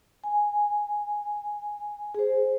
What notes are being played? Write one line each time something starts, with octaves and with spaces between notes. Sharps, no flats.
G#5
G#4 C5